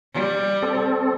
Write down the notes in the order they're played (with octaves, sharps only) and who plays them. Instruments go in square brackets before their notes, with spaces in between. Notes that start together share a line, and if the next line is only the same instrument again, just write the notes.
[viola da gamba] G3
[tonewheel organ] C4 A4